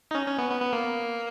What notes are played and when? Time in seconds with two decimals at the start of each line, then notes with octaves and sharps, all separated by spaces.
0.11 D#4
0.15 C#4
0.26 C#4
0.38 B3
0.50 B3
0.61 B3
0.73 A#3